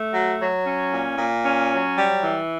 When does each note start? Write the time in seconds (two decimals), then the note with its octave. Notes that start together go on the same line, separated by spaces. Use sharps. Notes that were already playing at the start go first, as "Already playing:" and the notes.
Already playing: A3
0.12 F#3
0.39 F#3
0.64 C#4
0.91 A#2
1.18 A#2
1.44 C#4
1.70 F#3
1.97 G3
2.23 E3